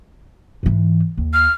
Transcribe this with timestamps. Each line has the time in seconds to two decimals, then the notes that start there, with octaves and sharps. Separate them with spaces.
0.63 G#2 E3
1.17 D#2
1.34 F6